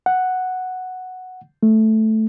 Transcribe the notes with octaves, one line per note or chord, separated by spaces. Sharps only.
F#5
A3